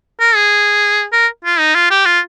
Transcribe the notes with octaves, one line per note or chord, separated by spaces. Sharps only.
A#4
G#4
A#4
F4
D#4
F4
G4
F4